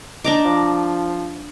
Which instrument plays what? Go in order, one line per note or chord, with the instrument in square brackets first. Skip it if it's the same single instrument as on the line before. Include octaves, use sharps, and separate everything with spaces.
[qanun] D4 A#5 D6 [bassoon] D#4
[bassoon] F3